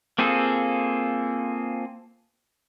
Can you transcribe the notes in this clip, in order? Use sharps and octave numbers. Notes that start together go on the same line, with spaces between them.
A#3 C4 F4 G#4 A4